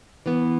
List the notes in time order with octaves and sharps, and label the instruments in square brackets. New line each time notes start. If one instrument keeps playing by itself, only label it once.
[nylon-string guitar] E3 B3